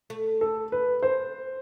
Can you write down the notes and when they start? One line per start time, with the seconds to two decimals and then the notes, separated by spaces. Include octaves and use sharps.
0.10 A3
0.41 A4
0.72 B4
1.03 C5